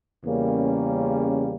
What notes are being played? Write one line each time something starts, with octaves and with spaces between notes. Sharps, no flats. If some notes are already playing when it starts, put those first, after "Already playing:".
E2 C#3 G3 A#3 C#4